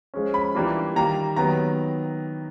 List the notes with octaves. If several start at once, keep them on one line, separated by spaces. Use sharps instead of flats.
F3 G#3 C#4
B5
E3 G3 A#3 D4 F4
D#3 G3 A#3 A#5
D#3 F#3 B3 A#5